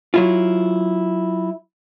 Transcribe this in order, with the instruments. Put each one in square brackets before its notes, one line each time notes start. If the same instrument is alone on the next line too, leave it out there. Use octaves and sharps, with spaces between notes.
[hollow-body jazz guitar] F#3 E4 F4